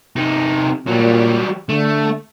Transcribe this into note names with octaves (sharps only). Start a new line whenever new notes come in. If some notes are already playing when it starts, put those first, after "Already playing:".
C3 D#4
A#2 F#3 G3
D3 A3